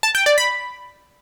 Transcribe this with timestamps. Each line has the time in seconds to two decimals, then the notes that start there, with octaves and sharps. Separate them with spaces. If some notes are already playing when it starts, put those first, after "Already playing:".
0.03 A5
0.15 G5
0.26 D5
0.38 B5